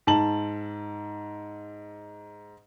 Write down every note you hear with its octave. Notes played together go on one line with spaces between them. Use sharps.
G#2 A5 F#7